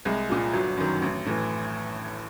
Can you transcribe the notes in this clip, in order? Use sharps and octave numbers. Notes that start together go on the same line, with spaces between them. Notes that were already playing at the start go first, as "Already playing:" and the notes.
C2 G#3
A#2 F3
G1 F#3
F#2 D#3
A1
A2 E3